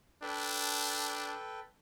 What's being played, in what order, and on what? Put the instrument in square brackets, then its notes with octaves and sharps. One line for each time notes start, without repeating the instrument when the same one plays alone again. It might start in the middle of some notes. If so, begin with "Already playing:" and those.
[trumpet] D4 [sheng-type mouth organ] A4 B4 G5